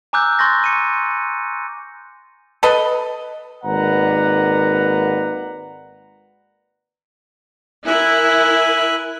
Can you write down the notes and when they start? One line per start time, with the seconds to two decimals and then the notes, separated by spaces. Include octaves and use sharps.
0.13 G#5 A#5 D6 E6 F#6 G6
0.39 C6 C#6 G6 A6 A#6
0.64 C#7 D#7
2.63 A4 B4 D#5
3.64 G#1 A#3 B4 D5 F#5 A#5
7.86 E4 A#4 E5 G#5 F#6